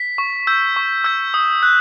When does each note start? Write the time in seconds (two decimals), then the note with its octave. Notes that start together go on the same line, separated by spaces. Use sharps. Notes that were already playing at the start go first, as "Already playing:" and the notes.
Already playing: B6
0.18 C#6
0.47 E6 G6
0.76 C#6
1.04 E6 G6
1.34 D#6
1.63 F#6